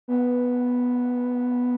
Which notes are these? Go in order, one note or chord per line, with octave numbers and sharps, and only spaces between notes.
B3